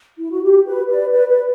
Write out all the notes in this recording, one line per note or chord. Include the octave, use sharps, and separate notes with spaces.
E4
F#4
G4
B4
B4 D5
B4 D5
B4